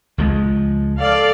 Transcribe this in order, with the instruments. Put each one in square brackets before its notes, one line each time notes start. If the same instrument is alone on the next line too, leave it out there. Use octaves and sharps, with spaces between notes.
[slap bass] C#2 F3 G#3
[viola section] A4 D5 F5